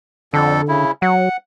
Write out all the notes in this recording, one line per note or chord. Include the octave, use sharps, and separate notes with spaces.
F2 D3 A4
C#3 E4
F#3 F#5